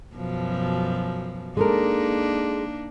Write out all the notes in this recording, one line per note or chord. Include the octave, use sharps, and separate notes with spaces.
F#2 B2 F3
G#3 A#3 D4 D#4 A4 A#4